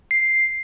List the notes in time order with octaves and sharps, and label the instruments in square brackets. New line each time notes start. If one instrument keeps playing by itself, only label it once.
[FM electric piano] C7